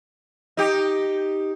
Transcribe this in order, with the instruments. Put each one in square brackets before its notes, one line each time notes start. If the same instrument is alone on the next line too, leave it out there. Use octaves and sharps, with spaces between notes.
[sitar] D#4 G4